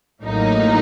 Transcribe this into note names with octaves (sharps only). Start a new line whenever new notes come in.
A1 A2 F#3 A#3 D#4